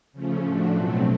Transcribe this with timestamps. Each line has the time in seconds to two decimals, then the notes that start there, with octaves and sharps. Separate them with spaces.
0.13 C#3 F3 A3 C#4
0.42 A2 F3 A3 D4 F#4
0.71 B2 F#3 A3 C4